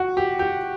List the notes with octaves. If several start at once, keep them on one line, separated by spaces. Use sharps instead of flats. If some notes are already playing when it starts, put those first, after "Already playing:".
Already playing: F#4
G4
G4